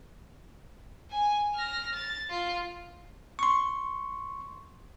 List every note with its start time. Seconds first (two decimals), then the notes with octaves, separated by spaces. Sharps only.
1.12 G#5
1.55 F6 A#6
1.94 A6
2.30 F4
3.39 C6 C#6